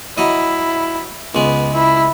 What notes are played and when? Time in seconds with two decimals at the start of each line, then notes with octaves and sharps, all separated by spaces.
0.18 F#3 E4 D#5
1.35 C#2 G#3 B3
1.73 E4